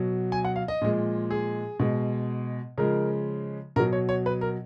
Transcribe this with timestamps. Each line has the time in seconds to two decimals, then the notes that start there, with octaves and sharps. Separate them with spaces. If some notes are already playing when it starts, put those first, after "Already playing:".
Already playing: B2 F#3
0.32 G#5
0.45 F#5
0.56 F5
0.68 D#5
0.82 A#2 F3 G#3
1.31 G#4
1.79 B2 G#3
2.78 C#3 F3 G#3 A#4
3.76 B2 F#3 A#4
3.93 C#5
4.09 C#5
4.26 B4
4.41 A#4